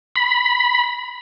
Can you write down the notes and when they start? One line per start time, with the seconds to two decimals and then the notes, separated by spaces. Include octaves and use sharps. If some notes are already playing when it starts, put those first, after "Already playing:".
0.16 B5